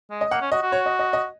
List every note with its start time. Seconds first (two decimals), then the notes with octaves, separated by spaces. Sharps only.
0.10 G#3
0.21 D#5
0.31 A#3 F#5
0.42 C#4
0.52 F#4 D#5
0.62 F#4
0.72 C#5
0.86 D#5
0.99 D#5
1.13 D#5